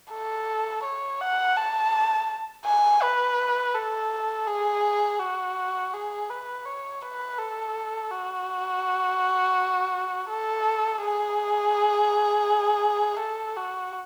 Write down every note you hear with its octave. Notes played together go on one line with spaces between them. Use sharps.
A4
C#5
F#5
A5
G#5
B4
A4
G#4
F#4
G#4
B4
C#5
B4
A4
F#4
A4
G#4
A4
F#4